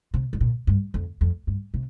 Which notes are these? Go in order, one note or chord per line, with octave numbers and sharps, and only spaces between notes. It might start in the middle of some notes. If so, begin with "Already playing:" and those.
C3
G2
A#2
G2
F2
F2
G2
C3